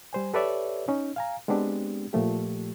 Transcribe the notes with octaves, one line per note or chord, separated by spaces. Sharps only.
G3 C5 G#5
G4 A4 B4 C#5 D5 E5
C#4 D#4
F5 G#5 A#5
G#3 B3 C4 D4 G4
A#2 F3 A3 G4